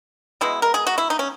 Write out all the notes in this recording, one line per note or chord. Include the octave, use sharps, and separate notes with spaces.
B2 G#3 B3 E4
A#4
G#4
F#4
E4
D#4
C#4